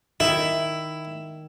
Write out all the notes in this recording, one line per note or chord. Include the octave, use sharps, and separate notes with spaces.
D#3 E4